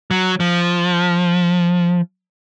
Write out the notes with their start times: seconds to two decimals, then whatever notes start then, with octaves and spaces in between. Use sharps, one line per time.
0.11 F#3
0.40 F3